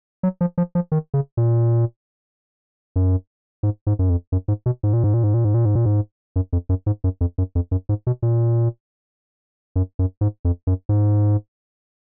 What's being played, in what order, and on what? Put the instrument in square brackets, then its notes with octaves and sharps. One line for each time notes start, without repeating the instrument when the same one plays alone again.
[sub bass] F#3
F3
F3
F3
D#3
C#3
A#2
F#2
G#2
G#2
F#2
F2
F#2
G#2
B2
G#2
A#2
G#2
A#2
G#2
A#2
G#2
A#2
G#2
A#2
G#2
F#2
F2
F#2
G#2
F#2
F2
F#2
F2
F#2
G#2
B2
A#2
F#2
F#2
G#2
F2
F#2
G#2